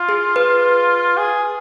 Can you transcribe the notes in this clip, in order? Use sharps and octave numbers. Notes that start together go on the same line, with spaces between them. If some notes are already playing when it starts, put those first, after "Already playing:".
Already playing: F4
G#4
B4
G#4